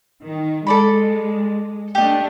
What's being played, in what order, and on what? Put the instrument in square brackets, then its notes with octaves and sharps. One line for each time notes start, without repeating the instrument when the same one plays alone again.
[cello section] D#3
[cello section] G#3 [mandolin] A4 D5 B5
[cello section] A3 D4 [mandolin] G4 D#5